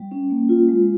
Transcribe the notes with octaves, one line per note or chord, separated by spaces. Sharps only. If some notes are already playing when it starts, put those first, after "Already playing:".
Already playing: G3
C#4
A#3
F4
G#3